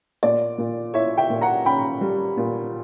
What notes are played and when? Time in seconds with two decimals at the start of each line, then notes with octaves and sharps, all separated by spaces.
0.23 A#2 D5
0.58 A#2
0.94 E4 C#5 E5
1.18 E5 G5
1.30 A#2
1.41 F#5 A#5
1.66 C#4 G5 B5
2.01 G3
2.37 A#2